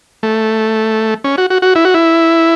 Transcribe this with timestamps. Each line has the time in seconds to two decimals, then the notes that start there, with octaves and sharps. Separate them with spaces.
0.23 A3
1.24 C#4
1.38 F#4
1.50 F#4
1.62 F#4
1.75 E4
1.85 F#4
1.94 E4